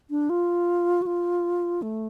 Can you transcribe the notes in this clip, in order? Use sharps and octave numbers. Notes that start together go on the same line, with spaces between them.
D4
F4
F#4
F4
A3